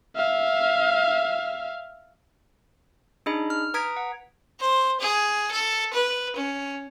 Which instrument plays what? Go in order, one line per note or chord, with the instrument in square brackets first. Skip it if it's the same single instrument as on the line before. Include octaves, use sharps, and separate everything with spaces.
[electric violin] E5 F5
[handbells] D4 D#4 G#4 D#5 B5
F6
B4 A#5 D#6 G#6 B6 D7
F#5
[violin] C5
G#4
A4
B4
C#4